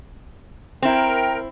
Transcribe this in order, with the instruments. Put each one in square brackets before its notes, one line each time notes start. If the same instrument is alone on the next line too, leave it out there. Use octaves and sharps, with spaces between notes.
[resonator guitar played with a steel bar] C4 E4 [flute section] A#4 G5